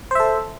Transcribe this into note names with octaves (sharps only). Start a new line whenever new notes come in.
A4 C5 E5